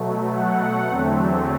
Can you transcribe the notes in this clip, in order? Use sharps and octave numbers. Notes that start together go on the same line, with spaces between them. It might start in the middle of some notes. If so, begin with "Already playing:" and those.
Already playing: B2 F#3 A3
F#5
E2 D3 F#3 A3 C4